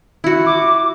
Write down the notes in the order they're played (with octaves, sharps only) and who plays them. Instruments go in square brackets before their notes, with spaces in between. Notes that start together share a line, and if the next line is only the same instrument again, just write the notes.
[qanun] E4 F#4
[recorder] D6